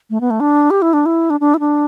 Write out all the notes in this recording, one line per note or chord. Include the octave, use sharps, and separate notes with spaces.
A3
B3
A3
D4
G4
E4
D4
E4
D4
D4
E4
D4